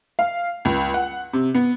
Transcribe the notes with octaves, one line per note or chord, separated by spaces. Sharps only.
F5
C#2
F#5
C3
B3